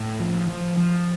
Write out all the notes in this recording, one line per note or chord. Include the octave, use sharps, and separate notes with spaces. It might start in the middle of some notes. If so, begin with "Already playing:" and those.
Already playing: A2
F3
F3
F3